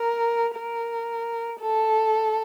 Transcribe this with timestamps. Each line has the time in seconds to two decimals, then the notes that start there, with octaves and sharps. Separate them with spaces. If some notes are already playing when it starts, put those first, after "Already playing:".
Already playing: A#4
0.57 A#4
1.60 A4